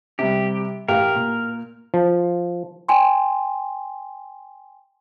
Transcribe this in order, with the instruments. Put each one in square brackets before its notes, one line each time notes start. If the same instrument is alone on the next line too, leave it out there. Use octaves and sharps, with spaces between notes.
[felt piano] C3 G3 [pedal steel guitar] G4
[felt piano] A1 G4 F5 [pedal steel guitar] A#4
[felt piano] A#2
[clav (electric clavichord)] F3
[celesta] G5 G#5 C6